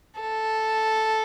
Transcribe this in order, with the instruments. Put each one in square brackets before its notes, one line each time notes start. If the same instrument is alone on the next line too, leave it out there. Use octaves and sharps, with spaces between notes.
[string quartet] A4